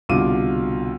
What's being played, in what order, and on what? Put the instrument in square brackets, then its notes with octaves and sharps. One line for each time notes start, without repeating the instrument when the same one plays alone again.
[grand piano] C2 B2 D3 F4 D6 D#7